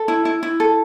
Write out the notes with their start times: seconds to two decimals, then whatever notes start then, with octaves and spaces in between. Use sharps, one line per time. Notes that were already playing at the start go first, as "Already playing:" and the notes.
Already playing: A4
0.08 E4
0.25 E4
0.43 E4
0.60 A4